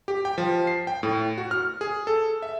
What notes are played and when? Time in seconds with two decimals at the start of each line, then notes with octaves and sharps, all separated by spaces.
0.08 G4
0.25 G5
0.38 F3
0.67 C7
0.87 G5
1.03 A2
1.38 F#4
1.51 F6
1.81 G#4
2.07 A4
2.42 E5